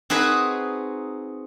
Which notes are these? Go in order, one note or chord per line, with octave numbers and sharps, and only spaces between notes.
C4 D#4 F#4 G#4 B4